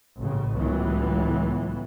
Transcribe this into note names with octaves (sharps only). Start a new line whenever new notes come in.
A1 C#3
C#2 A2 E3 F#3 B3